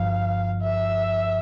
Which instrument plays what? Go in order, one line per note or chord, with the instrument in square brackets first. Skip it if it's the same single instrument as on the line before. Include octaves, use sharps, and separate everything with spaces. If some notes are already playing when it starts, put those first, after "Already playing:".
Already playing: [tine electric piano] G1 G2 F3 [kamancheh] F5
[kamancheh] E5